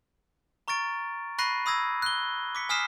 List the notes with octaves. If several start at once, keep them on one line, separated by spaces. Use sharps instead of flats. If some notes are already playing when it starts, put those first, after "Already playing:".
A#5 C#6 F6 A6 D7
B5 C#6 F#6 A#6 C7 D#7
B5 D#6 E6 G#6 A#6
F#6 G7
D6 B6 C#7
G#5 D#6 F6 B6 C7 E7